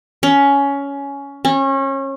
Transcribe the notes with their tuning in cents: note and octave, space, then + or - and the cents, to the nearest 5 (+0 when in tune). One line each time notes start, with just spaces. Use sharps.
C#4 +15
C#4 -30